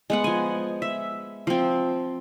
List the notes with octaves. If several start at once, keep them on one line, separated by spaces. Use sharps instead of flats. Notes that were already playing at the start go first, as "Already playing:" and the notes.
G#3 B3 F#5
F3 G#5
E5
F3 C4